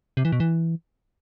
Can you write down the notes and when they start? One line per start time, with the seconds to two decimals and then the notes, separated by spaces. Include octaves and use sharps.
0.17 C3
0.25 E3
0.32 B2
0.40 E3